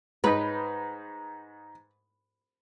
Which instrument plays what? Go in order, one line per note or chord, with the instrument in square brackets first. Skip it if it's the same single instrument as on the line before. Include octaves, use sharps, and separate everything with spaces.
[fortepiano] G#2 D#4 [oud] B4